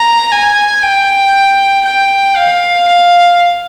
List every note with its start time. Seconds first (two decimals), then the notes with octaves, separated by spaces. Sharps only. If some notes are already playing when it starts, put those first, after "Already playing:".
Already playing: A#5
0.32 G#5
0.83 G5
1.85 G5
2.36 F5
2.88 F5